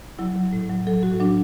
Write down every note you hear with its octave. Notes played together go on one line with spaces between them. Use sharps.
F#3 E4
F#3
A2
F#3
F#3 A4
A2 F#4
F#3 D4